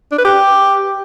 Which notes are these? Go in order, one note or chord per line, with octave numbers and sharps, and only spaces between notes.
D4
B4
G4